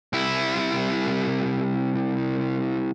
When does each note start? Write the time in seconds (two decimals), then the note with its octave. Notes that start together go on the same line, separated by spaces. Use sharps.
0.13 C2 E4